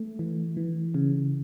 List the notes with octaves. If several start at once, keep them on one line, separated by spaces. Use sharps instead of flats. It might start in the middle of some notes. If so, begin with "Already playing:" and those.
Already playing: A3
E3
E3
C#3